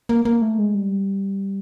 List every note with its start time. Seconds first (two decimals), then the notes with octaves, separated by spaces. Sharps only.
0.09 A#3
0.25 A#3
0.42 A3
0.58 G#3
0.74 G3